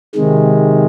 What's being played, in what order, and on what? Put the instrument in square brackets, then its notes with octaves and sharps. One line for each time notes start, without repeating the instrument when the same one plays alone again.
[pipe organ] C3 D#3 G#3